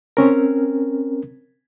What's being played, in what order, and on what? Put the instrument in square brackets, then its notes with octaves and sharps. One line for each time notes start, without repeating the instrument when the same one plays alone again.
[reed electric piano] C4 C#4 A#4